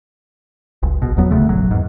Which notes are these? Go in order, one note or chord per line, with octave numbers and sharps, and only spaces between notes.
F#1 C#2
A#1 B2
F1 E2 F#3 B3
E1 D2 C#3 A3
F1 A#1 F#3
E2 G#2